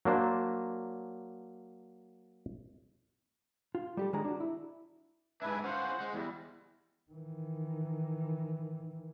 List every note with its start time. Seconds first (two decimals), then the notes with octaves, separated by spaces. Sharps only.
0.05 F#3 A#3 D4 C5
3.75 F4
3.97 G3 G4 A4
4.13 D#3 G#3 D4 G#4 C#5 A#5
4.24 D4 F#4
4.40 E4
5.42 G#2 D4 B4 E5 G#5
5.64 C#4 F4 C5 F#5
6.00 G#3
6.14 E2 G3
7.11 D#3 E3